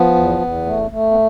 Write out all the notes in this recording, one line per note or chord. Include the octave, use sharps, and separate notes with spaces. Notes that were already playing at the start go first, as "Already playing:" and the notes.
Already playing: F3 B3
E2
E2
A3
A3
B3